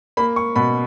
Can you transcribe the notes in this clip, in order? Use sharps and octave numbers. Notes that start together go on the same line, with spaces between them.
A#3 B5
C#6
B2 B5